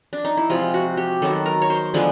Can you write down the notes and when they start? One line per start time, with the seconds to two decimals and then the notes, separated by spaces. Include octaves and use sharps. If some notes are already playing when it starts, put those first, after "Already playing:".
0.13 D4
0.25 D#4
0.37 E4
0.49 C3 F3 G#3 F4
0.74 F#4
0.97 G4
1.22 D#3 F#3 B3 A4
1.46 A#4
1.62 C#5
1.70 C5
1.94 D3 F3 G#3 B3